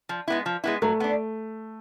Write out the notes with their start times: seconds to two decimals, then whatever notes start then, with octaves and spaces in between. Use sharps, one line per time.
0.09 F3
0.28 G#3 B3 E4
0.46 F3
0.64 G#3 B3 E4
0.82 F#3 A3
1.00 B3 D4